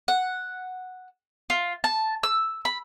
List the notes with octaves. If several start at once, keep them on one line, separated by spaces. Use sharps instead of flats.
F#5
F4
A5
E6
B5